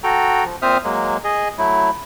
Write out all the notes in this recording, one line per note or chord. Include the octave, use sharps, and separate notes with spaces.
F#4 A4 G5 A#5
F3
A#2 C4 C5 E5 D#6 F6
F#3 G#3 A#3
G#4 D#5
F#3 A3 E4